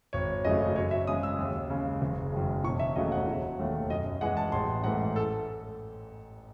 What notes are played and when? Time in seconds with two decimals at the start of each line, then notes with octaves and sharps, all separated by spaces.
0.13 G#1 C#5
0.45 F#2 C#3 F#3 A3 D#5
0.76 F#2 C#5
0.91 E5
1.07 C#3 G#3 D#6
1.23 E6
1.39 D#2
1.70 C#3 G#3
2.02 F#1
2.32 F#2 D#3 G#3
2.64 E1 C#6
2.79 E5
2.96 D#2 C#3 F#3 A3 D#5
3.12 F#5
3.27 E1
3.59 D#2 D#3 A3
3.90 F#2 D#5
4.21 E3 G#3 F#5
4.37 A5
4.52 A1 C6
4.84 G#2 E3 A3 F#5
5.16 A4